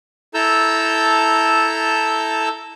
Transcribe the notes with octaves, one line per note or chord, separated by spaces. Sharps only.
E4 A4 A5 A#5 E6 G6